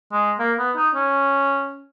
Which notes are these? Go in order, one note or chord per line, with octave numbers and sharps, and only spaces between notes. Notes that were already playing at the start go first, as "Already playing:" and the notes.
G#3
A#3
B3
D#4
C#4